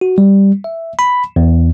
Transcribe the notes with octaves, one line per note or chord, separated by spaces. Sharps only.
F#4
G3
E5
B5
E2